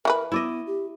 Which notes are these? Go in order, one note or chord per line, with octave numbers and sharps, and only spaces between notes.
E3 F#4 A#4 B4
B3 E4 D5 D#5
G4